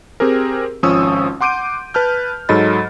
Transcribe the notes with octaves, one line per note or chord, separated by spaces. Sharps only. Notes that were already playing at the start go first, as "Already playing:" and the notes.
C4 G4 G#4 A#4
G#1 F3 C#4 C#6 D#6 E6
F#5 C6 D6 G6 D7 D#7
B4 A5 F6 G6
G#2 F#3 A4 D#5 B5 A6